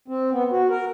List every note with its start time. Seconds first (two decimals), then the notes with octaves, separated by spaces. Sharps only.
0.08 C4
0.32 B3
0.52 F#4
0.69 A#4